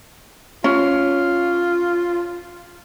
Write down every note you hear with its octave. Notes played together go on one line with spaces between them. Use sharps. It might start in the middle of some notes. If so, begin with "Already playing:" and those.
C#4 F4